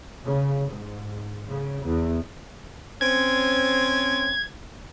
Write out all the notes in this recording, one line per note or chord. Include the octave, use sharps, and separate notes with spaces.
C#3
G#2
C#3
E2
C4 C#4 G#6